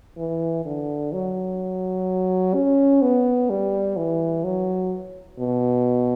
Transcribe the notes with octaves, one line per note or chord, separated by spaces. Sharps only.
E3
D3
F#3
C#4
B3
G3
E3
F#3
B2